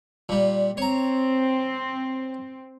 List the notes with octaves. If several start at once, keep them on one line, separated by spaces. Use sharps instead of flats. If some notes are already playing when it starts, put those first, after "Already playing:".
A#2 G3
C4 C#5 A#5